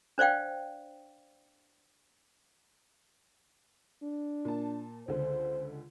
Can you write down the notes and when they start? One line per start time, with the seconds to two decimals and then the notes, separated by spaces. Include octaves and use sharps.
0.18 D4 C5 D5 F5 G5
4.03 D4
4.45 A#2 A5
5.08 C#2 D3 C5